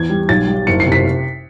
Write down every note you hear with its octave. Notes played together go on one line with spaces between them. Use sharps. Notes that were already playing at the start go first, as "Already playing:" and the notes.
Already playing: E2 G#6
G3
B1 A6
G3
F#1 C#7
C7
C3
B6